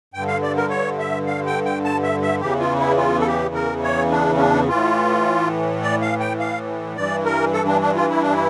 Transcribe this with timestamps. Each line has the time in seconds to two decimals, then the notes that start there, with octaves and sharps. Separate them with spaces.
0.14 G2 D3 G5
0.28 F5
0.43 D5
0.56 A#4
0.70 C#5
0.99 E5
1.27 F5
1.46 G5
1.65 G5
1.84 A5
2.03 E5
2.22 E5
2.41 E2 C#3 E3 G4
2.60 F4
2.79 E4
2.98 F4
3.20 A4
3.27 G4
3.54 A#4
3.83 C#5
4.12 D4
4.37 C#4
4.40 D4
4.68 A2 E3 F4
5.82 D5
6.02 F5
6.20 G5
6.39 F5
6.96 G2 E3 D5
7.25 A#4
7.53 A4
7.67 D4
7.81 D4
7.96 F4
8.10 E4
8.22 D4
8.33 E4